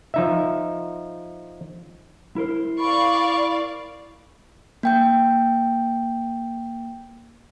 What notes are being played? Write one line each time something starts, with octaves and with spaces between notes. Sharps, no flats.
F3 D#4 E5
E4 A#4 C5
D5 F5 B5 C#6
A#3 G5 G6